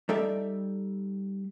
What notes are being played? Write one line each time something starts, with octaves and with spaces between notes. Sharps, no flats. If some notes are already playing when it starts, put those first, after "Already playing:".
G3 D#4 A4 D5 E5